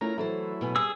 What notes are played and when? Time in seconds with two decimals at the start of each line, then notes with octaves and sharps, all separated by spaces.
0.01 A3 C#4 E4 F4 A#4 A#5
0.18 E3 F#3 A3 E4 A4 C5
0.61 B2 B3 G#5
0.76 G3 G#4 E6